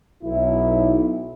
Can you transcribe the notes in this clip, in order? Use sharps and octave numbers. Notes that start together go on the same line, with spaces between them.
B1 E4